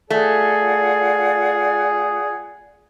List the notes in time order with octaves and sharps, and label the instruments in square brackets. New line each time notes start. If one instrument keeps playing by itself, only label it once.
[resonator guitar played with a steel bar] A3 [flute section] F4 D5 F#5 [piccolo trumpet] G#4